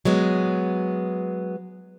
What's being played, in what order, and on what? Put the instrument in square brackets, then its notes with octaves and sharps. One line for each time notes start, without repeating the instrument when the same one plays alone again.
[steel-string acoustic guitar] F#3 G#3 B3